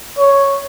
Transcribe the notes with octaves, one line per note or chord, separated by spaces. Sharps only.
C#5